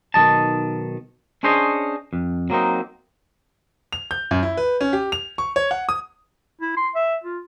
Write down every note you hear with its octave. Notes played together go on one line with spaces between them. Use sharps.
B1 D#3 F#3 D#5 A5
C#4 D4 G#4 C5 C#5 D#5
F2
F#3 A#3 C4 D#4
F7
G6
F#2
E4
B4
C#4
G4
F7
C#6
C#5
F#5
D#6
E4
C6
E5
F4